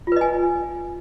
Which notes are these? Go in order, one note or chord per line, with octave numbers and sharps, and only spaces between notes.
F4 B4 D#5 G#5